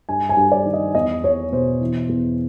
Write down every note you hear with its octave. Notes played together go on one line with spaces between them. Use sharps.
G2 G#5
G#5
G2
D5
D#3
D#5
E2 D#5
E2 C#5
B2 C5
E3
E2